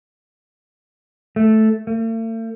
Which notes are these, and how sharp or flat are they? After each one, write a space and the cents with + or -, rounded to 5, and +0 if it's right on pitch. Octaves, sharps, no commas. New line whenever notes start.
A3 -5
A3 +45